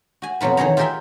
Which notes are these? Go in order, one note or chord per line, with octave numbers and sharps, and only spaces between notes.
F#4 G#5
F2 B2 F#3 F4 B4
D#3 E3 F#3 G#4 C#5 A#5
F4 G4 G#4 A#4 E5 G5